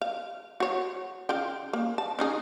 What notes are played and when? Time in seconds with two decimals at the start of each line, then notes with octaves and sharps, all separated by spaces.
0.01 F5
0.60 F#4 C#5
1.29 C#3 F4 G5
1.73 A#3
1.98 A5
2.19 C#4 D#4 G#4